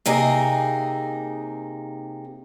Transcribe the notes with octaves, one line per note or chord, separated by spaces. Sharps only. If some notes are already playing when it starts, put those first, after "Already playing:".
C3 A#3 D#4 G#4